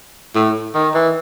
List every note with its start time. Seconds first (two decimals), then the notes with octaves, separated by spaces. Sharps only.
0.35 A2
0.75 D#3
0.95 E3